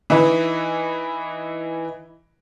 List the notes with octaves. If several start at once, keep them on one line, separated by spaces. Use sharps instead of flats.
E3 D#4 E4 B4